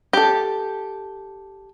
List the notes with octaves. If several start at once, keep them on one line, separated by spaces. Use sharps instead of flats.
G4 A4